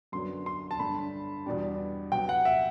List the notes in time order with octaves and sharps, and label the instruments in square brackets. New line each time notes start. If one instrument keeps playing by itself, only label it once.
[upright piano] F#2 D3 F#3 B3 [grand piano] C6
[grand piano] C6
A5
[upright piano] G2 D3 A3 [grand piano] B5
[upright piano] E2 B2 G3 D4 G4
[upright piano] C3 F#3 B3 [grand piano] G5
[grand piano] F#5
E5